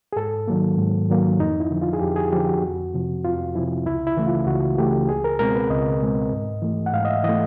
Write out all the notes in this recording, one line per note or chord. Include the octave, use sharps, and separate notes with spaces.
G#4
G#2 A4
D#3 F#3 A#3
G#2
D#3 F#3 A#3
F2 D#4
E4
D3 F3
F4
G#4
F2 G4
G#4
D3 F3 G4
F#4
F2
C3 F3
F2 F4
C3 F3 E4
C#2 E4
E4
C#3 E3 A3
F4
C#2 F#4
C#3 E3 A3 G4
C#2 G#4
A#4
B2 G#3 C4 A#4
B4
C#2 D#5
B2 G#3 C4
G#2
E3 A3
F#5
G#2 F5
D#5
E5
E3 A3 D#5